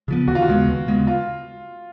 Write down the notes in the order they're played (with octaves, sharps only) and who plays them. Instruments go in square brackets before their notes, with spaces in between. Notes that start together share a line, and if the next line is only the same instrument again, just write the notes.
[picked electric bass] C#3 F3 B3
[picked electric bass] D#2 [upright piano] F#4
[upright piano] F4
F#4
[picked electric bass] C#3 G#3 B3
D#2
C#3 G#3 B3
[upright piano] F4